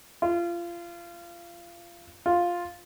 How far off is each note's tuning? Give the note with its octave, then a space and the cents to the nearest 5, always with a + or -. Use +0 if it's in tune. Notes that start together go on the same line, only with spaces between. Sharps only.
F4 -25
F4 +5